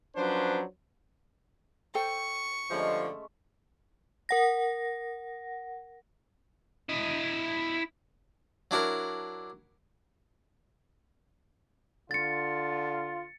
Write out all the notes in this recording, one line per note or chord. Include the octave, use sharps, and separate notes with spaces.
F3 F#3 C#4 D4 B4 C5
A4 C5 G5 C#6
G2 D3 F3 G#3 A3 C#4
A#4 F#5 A#6
E4 D#5
F#3 D4 E4 A#4
D3 F4 A6 C#7